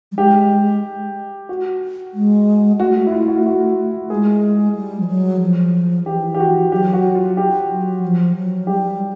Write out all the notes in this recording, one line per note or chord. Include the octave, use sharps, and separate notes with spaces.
G3
G#3 G4
F#4
G#3
A3 F#4
E4
F4
F#4
F4
F#4
G#3 G#4
G3
F3
F#3
F3
E3 G4
G4
F#4
F#3 G4
F#4
F4
G4
F#3
F3
F#3
G3 G4